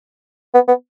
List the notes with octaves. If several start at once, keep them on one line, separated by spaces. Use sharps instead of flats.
B3
B3